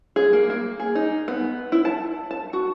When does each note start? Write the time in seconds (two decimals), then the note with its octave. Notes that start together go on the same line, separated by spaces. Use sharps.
0.16 G#4
0.33 A#3
0.50 A#3
0.80 G#4
0.95 D#4
1.28 B3
1.72 E4
1.85 A5
2.31 A5
2.53 F#4